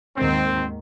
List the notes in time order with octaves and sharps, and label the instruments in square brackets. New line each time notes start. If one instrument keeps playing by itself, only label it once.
[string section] D#2 G#2 D#3 [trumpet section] C4